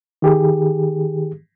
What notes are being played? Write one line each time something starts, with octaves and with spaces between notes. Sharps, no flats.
D#3 G4 G#4